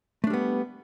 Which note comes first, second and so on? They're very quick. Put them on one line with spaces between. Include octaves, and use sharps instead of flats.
A3 D4 G3 B3